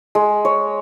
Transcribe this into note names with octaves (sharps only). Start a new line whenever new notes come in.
G#3
C#5